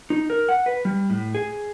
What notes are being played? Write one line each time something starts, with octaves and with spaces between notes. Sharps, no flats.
D#4
A#4
F#5
B4
G3
A2
G#4